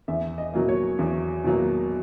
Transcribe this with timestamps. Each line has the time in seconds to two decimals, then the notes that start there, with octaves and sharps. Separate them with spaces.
0.08 E2 E5
0.38 D#5
0.54 B2 F#3 A#3
0.69 C#5
0.99 E2
1.44 B2 F#3 A#3